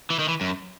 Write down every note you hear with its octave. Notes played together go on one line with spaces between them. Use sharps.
E3
D#3
E3
F#2